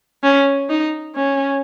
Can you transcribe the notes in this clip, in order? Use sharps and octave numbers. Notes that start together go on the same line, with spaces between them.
C#4
D#4
C#4